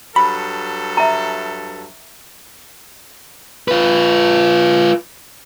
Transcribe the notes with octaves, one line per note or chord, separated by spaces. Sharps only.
G2 F#3 A4 B5
E5 A#5
F4 B4